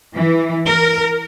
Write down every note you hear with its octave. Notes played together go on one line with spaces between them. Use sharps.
E3
A#4